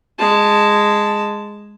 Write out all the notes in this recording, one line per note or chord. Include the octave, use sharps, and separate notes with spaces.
G#3 A5